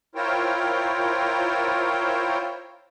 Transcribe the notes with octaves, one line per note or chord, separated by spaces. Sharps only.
E4 F4 A#4 C5 C#5 G5